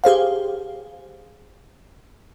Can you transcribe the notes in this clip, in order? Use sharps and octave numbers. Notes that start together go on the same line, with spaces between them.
G4 G#4 C5 F5